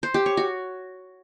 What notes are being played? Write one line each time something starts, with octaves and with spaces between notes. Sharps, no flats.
C5
G4
C#5
F#4